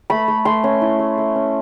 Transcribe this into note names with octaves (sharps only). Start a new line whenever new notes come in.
A3 B5
A3
A3 C6
C#4
E4
A3
A3
C#4